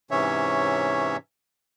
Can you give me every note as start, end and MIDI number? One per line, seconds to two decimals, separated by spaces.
0.11 1.17 44
0.11 1.17 48
0.11 1.17 52
0.11 1.17 61
0.11 1.17 73
0.11 1.17 76